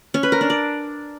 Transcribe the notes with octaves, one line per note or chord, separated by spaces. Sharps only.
C#4
B4
A#4
D4
D5